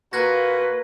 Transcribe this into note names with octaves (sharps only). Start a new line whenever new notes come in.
A#2 A#3 F#4 B4 F#6 G#6 A#6